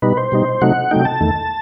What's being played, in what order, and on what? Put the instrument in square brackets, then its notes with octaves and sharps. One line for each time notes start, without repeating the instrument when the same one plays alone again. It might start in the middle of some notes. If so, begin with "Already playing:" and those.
[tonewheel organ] B2 G3 D#4 B4
C5
B2 G3 D#4
C3 F#3 A3 D#4 F#5
C3 F#3 A3 D#4 G5
A5
E2 D#3 A3